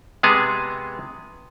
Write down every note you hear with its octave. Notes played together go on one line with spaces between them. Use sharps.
C3 G#3 B3 G#4 A5